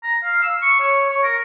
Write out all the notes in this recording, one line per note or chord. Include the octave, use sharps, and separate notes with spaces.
A#5
F5
E6
C#6
C#5
C#5
A#4